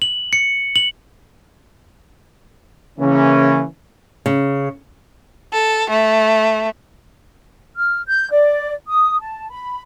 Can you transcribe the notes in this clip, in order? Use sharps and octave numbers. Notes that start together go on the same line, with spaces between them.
F#7
C#7
F#7
C#3 E3 A#3 C#4
C#3
A4
A3
F6
G6
D5
D#6
A5
B5